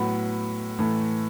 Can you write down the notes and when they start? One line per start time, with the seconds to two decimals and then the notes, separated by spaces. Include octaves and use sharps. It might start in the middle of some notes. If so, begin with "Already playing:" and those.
Already playing: A2 F#3 B3 B5
0.79 A2 E3 A3